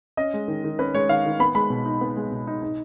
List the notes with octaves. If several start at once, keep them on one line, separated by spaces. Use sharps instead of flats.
C#4 D#5
G#3
D#3
D#3
C#4 B4
G#3 C#5
D#3 F5
D#3
B3 B5
G#3 B5
B2
D#4
B3
G#3
B2
D#4
D#4